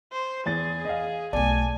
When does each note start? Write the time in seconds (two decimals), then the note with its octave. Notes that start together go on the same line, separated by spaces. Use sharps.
0.12 C5
0.46 E2 G#4 A6
0.85 D#5 F5
1.33 B1 A3 D5 G#5 A5